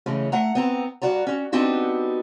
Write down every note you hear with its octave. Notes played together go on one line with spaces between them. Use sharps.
C#3 E3 G#3 A3 C#4
A3 F#5 A#5
B3 C4 A#5
G2 F#4 D5 A#5
C#4 F#4
B3 C4 D4 D#4 F#4 G4